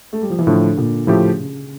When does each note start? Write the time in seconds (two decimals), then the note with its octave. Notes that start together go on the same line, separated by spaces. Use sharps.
0.13 A3
0.22 G3
0.30 F3
0.39 E3
0.47 A2 D3 F3 A3
0.77 A#2
1.07 A2 C#3 F3 A3 E4 G4
1.38 C#3